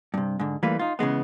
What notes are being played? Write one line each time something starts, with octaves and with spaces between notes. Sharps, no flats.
G2 C3
G#2 D3
E3 G3 A3 A#3 F4 B4
D#4 F4
C#3 E3 G#3 B3